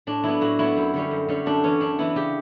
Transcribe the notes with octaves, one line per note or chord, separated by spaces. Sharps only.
A2 D4
F#3 B3 E4
A2 F#4
F#3 B3 E4
F#2
D3 G3 C#4
F#2
D3 G3 C#4
F#2 D4
E3 B3 C#4
F#2 D4
E3 B3 E4
C#3 G4